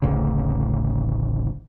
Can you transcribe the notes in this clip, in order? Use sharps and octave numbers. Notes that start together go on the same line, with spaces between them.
D1 A1 D2 C#3